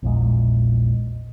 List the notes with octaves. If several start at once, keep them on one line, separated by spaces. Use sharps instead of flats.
A#1 E2 A#2 G#3